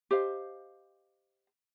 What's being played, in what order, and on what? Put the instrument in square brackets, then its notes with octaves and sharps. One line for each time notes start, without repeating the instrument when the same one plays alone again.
[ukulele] G4 C5 D#5 F5